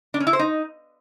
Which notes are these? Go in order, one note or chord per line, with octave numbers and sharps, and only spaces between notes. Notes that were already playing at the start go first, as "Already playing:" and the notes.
D4
C#4
E4
C5
D#4